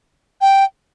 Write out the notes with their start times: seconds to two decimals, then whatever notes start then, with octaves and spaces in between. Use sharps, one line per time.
0.41 G5